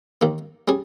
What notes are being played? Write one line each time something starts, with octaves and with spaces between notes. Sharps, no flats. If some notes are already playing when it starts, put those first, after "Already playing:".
D#2 D#3 A#3
G3 C#4 G#4